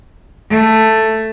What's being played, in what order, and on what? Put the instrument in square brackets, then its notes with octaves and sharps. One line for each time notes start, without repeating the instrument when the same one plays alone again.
[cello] A3